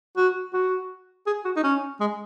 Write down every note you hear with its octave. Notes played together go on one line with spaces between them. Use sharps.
F#4
F#4
G#4
F#4
D#4
C#4
G#3